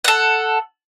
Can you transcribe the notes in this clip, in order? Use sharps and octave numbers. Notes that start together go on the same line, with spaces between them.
A4 F#5